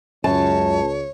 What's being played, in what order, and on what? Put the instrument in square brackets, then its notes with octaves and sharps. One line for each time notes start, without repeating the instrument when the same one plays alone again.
[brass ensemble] C#2 [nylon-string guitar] F#2 [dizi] C#5 [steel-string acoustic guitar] A5